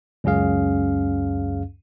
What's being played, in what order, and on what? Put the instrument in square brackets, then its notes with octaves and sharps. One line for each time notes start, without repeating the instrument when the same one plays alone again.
[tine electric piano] C#2 F#2 C#4 G#4 F5